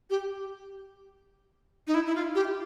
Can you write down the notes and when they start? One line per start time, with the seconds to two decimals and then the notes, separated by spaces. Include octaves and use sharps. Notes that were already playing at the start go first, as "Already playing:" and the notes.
0.10 G4
1.87 D#4
1.94 E4
2.07 E4
2.15 F4
2.35 G4